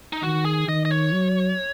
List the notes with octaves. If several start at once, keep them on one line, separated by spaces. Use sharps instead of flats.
D#4
D#3 F#4
G#4
D#3 D#5
D#5
C#5
F#3